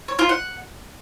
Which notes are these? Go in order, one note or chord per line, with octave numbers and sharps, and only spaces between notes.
C#5
F4
F#5